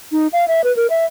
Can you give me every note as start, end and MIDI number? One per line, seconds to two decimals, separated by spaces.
0.12 0.27 63
0.33 0.48 77
0.48 0.61 76
0.64 0.74 71
0.76 0.87 70
0.90 1.05 76